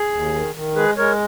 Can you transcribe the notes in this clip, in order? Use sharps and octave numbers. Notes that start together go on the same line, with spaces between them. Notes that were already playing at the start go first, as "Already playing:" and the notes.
Already playing: G#4
D#2
D#3
D#3
G#3 G#4 B4
G#3 A#4 C#5